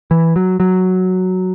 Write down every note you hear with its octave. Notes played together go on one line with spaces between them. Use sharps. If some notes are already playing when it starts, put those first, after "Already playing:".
E3
F#3
F#3